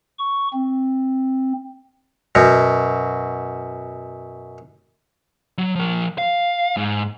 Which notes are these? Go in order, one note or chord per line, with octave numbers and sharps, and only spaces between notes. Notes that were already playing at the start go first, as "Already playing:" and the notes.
C#6
C4
F#2 B2
F#3
F3 A#4
F5
G#2